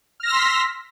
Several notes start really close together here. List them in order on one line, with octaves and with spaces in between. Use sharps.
F6 A#6 E6 C6 B6